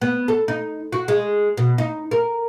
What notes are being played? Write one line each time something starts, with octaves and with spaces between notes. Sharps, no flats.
B3
A4
D#4
F#4
G#3
B2
D#4
A#4